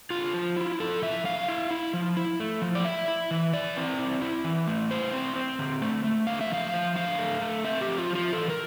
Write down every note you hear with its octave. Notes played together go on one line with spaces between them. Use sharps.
D3 F4
F3
E4
F3 A4
F3 E5
D3 F5
E4
E4
F3
E4
A3
F3
D5
E4 E5
E4
E3
E4 D5
C4
E4
E4
E3
A3
E4 C5
C4
C4
D3
A3
A3
D3 F5
E5
F3 F5
F3
D3 F5
A3
A3
C4 E5
G4
F3
F4
F3
F4
E3 A4
A#4